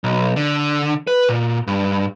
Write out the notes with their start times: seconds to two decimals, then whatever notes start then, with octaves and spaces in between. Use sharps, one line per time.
0.04 B1
0.36 D3
1.07 B4
1.29 A#2
1.67 G2